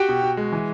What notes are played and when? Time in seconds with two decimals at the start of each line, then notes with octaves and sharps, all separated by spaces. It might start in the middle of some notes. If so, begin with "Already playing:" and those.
Already playing: F#4 G4 G5
0.09 B2
0.23 F#4
0.37 G#3
0.52 E3